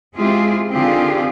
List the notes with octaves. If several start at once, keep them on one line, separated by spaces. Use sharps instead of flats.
G#3 C4 E4 F4 G4 G#4
D3 D#3 C4 F4 G4 G#4